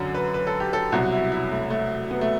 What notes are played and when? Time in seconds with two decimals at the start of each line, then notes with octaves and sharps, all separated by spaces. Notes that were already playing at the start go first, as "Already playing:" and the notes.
Already playing: F#2 D3
0.14 B4
0.34 B4
0.47 A4
0.60 G4
0.73 A4
0.92 C2 B2 F#3 F#4
1.12 E4
1.32 E4
1.52 A3
1.70 A3
2.11 B3
2.21 A3